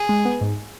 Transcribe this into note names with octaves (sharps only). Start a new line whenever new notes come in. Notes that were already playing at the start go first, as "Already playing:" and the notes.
Already playing: G#4
G#3
B3
G#2